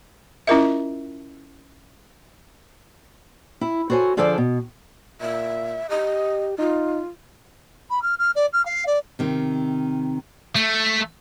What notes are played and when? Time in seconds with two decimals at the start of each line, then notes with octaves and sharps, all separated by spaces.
0.47 C#4 E4 F4 A#4 D#5 E5
3.61 E4
3.90 F#4 A4 C5 C#5 G#5
4.17 D3 F3 G#4 A4 C5 D5
4.38 B2
5.21 A#2 E5
5.90 G4 D#5
6.59 D#4 F4
7.90 B5
8.02 F6
8.19 F6
8.35 D5
8.53 F6
8.65 F5
8.87 D5
9.19 C3 D#3 C4
10.56 A3